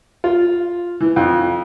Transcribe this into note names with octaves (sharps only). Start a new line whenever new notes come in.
F4
E3
F2